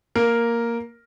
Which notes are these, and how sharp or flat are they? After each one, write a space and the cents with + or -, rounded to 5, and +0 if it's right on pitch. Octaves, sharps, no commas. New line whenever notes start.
A#3 +0 A#4 +0